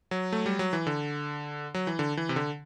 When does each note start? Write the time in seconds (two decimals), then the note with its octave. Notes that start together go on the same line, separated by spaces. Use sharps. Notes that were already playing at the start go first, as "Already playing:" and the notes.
0.11 F#3
0.32 A3
0.46 G3
0.59 F#3
0.73 E3
0.87 D3
1.74 F#3
1.87 E3
1.99 D3
2.17 E3
2.29 C3
2.36 D3